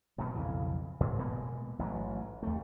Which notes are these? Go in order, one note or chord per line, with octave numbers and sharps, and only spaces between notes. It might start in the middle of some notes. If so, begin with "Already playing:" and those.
B2 D#3 F#3
B1 F2 C#3 E3
A2
B2 G#3 A#3 B3
A1 G#2 B2 F#3
D#2 A3